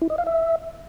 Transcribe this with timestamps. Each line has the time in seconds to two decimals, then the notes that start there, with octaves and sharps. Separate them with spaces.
0.02 E4
0.10 D#5
0.18 F5
0.27 E5